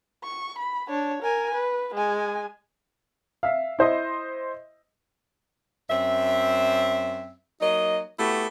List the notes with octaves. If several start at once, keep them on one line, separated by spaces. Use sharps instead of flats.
C#6
B5
D4 C#5
A#4 G#5
B4
G#3 G#5
E5 F5
E4 C5 D#5
F#2 C4 E5
F#3 A#3 D#4 D#5
A3 B3 E4 F#4 G4